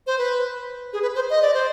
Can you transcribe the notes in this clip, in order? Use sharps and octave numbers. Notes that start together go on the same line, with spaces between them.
C5
B4
G#4
B4
C5
D#5
D5
C5